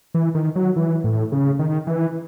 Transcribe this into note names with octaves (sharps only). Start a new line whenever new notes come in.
E3
D#3
F#3
E3
A2
C#3
D#3
E3